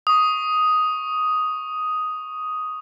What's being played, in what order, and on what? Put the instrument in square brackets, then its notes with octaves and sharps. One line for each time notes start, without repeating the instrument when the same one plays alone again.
[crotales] C#6 D#6